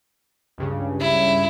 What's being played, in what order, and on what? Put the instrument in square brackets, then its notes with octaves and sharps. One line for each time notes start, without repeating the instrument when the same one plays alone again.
[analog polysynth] C#2 G2 C#3
[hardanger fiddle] E4